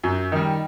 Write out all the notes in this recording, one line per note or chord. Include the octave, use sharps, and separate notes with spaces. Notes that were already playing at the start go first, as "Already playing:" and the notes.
F#2
D#3 G3